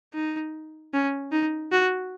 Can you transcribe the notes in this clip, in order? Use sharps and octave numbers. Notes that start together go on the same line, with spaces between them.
D#4
C#4
D#4
F#4